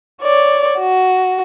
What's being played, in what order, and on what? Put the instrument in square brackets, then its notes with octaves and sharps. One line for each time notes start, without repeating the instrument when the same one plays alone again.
[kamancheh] C#5 D5
F#4